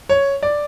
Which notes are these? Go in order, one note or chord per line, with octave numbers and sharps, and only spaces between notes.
C#5
D5